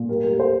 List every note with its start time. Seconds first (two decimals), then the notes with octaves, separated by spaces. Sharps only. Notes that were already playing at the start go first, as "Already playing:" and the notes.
Already playing: A#2
0.09 G3 A#4
0.24 G3 A#4
0.40 C5